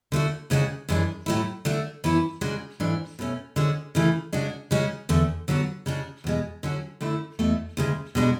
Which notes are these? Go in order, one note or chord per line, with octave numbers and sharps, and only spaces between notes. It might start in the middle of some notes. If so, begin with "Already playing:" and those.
D3 A3 D4 F#4
D2 C#3 G#3 D4 F#4
F#2 E3 G#3 D4
A2 F#3 A3 E4
D3 A3 D4 F#4
F#2 E3 B3 E4
C#3 G#3 D4 F#4
G#2 E3 A3 D4
B2 A3 C#4
D3 G#3 C#4 F#4
C#3 E3 A3
C#3 G#3 D4 F#4
C#3 G#3 C#4 F#4
E2 D3 A3
D3 F#3 B3 F#4
C#3 G#3 D4 F#4
E2 B2 G#3
D3 F#3 C#4 F#4
F#2 D3 A3 E4
E2 B2 A3
D2 C#3 G#3
B2 G#3 D4 F#4